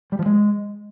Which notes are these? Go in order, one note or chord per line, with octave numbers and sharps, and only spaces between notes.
G3
F3
G#3